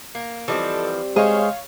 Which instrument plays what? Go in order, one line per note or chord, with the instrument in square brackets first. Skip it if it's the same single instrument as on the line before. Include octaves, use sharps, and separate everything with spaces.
[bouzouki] A#3
[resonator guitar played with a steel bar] E3 F3 [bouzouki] G3 A#3 C4 [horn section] A4 D#5
[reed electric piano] G#3 D#5 [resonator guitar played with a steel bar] G#4 C5 [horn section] C#5 F5